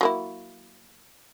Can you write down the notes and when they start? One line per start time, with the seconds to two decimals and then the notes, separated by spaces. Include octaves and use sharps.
0.01 F#3 A#3 E4